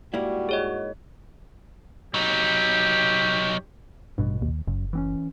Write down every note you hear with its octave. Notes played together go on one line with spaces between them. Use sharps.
G#2 G3 A#3 E4 F#4
G#4 C#5 D#5
F#3 D#4 G4
A1 G2 B2
D#2
F#1 F#2
E3 C4 C#4